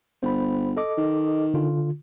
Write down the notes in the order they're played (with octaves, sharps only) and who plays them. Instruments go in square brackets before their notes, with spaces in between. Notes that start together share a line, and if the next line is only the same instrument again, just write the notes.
[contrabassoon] G1 [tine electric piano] C5 B5
[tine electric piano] A4 D#5 D6
[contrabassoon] D#3
[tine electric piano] D3 F4